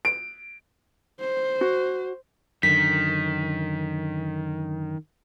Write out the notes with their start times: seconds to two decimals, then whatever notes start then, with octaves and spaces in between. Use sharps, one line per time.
0.05 D7
1.20 C5
1.61 F#4
2.63 F#2 D3 D#3 B6